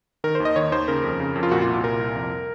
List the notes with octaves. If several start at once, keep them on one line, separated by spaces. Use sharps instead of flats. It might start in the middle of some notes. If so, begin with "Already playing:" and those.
D#3 A#4
D#2 C5
D#5
D#3 C#5
D#2 C5
C#3 A#4
F2
C#3
F2
F4
A#2 F#4
F4
C2
F4
A#2 A#4
C2
F2